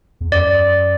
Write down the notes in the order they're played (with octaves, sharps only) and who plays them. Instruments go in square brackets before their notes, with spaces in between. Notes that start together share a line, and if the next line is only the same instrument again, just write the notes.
[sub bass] E2
[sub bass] F#2 [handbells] D5